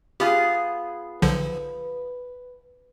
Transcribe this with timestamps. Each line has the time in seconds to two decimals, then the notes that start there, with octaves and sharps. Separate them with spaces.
0.20 B3 F4 G4 G#4
1.22 B1 D3 F3 B4